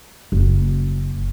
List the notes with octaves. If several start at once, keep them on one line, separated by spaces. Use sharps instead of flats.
F#1